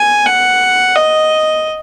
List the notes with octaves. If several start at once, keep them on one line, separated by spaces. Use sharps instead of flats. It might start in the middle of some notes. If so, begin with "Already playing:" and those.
Already playing: G#5
F#5
D#5